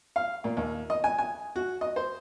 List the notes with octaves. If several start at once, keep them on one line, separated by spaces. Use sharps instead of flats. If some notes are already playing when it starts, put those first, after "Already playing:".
F5
A#2
D#2
D#5
G#5
G#5
F#4
D#5
C5